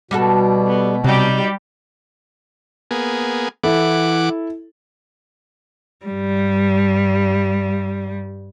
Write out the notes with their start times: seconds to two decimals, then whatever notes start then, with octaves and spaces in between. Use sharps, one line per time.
0.11 B2 G3 F#4 A4
0.67 B3
1.04 C3 F#3 G3 D#4 G4
2.91 A#3 B3 G#4
3.64 E3 E4 A4 F#5 D6
6.06 G2 G3